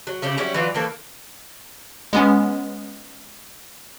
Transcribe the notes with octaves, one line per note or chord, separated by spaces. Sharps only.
F#3
C#3 C#4 E4 G4
F#3 G3 C#4 E4
E3 F#3 F4 D5
E3 A3 A#3 A4
G#3 B3 C#4